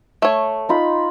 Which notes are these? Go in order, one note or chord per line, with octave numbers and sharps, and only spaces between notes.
A3 C#5
D#4 F4 B5